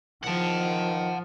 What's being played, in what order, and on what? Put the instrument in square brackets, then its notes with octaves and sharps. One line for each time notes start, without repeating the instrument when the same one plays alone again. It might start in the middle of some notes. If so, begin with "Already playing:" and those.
[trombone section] E2 D#3 [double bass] F3 [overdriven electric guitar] F#5 A5